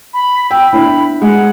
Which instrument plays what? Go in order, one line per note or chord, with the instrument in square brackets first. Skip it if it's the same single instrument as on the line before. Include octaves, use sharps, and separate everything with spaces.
[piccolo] B5
[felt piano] G5 [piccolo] E6
[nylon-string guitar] B3 D4 E4 [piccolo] B5
[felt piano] G#3 [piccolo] F#5